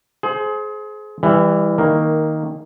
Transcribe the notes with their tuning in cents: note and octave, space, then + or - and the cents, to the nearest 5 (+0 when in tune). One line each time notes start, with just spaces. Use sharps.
G#4 +30 C5 +0
E3 +0 G3 +30
D#3 +10 A#3 +0